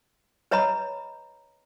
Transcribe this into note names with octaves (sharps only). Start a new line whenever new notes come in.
B4 C#5 D#5 A#5 B5